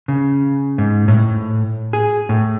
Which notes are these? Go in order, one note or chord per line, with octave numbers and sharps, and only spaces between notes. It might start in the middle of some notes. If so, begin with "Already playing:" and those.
C#3
G#2
A2
G#4
A2